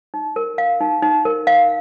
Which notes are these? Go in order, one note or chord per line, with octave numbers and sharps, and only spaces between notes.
D#4
A#4
F5
D#4
D#4
A#4
F5